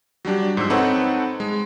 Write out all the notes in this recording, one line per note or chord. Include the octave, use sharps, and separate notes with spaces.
F#3 G3 D4 G4
G#2 F3 C5 E6
C4 D#4 A4 B4 C#5 F#5
G#3